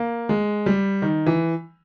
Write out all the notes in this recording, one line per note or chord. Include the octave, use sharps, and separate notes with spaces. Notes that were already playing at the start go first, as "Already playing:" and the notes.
Already playing: A#3
G#3
G3
D#3
E3